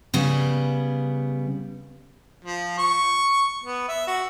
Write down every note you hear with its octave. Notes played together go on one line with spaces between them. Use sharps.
C#3 G3 B3
F3
C#6
B3
E5
F#4